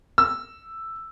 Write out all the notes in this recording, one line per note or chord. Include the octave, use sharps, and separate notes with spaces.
E6